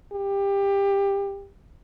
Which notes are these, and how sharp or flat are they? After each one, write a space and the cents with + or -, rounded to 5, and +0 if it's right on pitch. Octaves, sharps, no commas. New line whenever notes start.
G4 +20